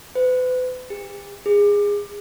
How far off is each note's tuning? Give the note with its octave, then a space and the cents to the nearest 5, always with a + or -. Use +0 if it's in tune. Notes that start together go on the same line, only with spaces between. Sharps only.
B4 +40
G4 +45
G#4 -20